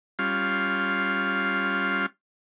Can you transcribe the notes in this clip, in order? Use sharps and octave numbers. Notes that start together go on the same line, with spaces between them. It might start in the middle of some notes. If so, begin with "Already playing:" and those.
G3 C#4 F4 F5 C6